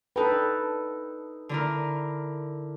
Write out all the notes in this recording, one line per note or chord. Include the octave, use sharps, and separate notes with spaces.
D4 D#4 A4 B4 G5
D3 E4 A#4